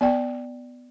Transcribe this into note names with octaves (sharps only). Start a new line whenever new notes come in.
B3 D5 G5